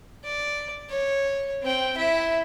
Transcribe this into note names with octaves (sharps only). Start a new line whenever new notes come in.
D5
C#5
C4 G5
E4 E5